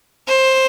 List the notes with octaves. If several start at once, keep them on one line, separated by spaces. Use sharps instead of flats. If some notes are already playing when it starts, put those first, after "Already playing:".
C5